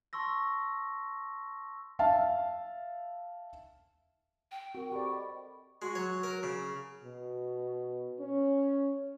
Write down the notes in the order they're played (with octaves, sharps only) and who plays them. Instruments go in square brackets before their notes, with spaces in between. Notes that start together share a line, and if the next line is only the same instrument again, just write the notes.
[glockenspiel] A5 C6 C#6 E6 A#6
[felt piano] E5 F5 A5
[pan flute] G5
[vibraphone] C4 A#4 [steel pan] F#4
[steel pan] G4 A4 D5 [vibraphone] C5 B5 C#6
[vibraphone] D#5 B5
[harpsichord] G#3 [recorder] F#4
[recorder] F#3 [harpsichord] C#5
[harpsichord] A#4
C#3
[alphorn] B2
C#4